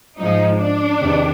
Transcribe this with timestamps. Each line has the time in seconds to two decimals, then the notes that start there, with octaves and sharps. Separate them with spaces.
0.19 G#2 F3 G#3 D#4
0.59 D4
0.99 E2 C3 D#3